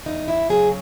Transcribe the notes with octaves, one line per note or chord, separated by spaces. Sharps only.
E2 D#4
E4
C#3 F#3 G#4